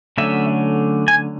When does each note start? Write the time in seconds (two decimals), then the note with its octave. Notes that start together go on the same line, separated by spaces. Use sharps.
0.17 D3 F#3 A3 C#4 E5
1.08 G#5